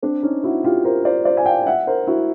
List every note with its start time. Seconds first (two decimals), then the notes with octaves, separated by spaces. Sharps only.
0.02 C4 D4
0.23 C#4 D#4
0.43 E4 F#4
0.64 F4 G4
0.84 A#4 C5
1.05 C5 D5
1.25 C5 D5
1.37 G#5
1.45 F5 G5
1.66 E5 F#5
1.87 A#4 C5
2.07 E4 F#4